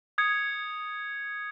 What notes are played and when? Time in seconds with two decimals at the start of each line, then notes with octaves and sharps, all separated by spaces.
0.18 D#6 G#6 C#7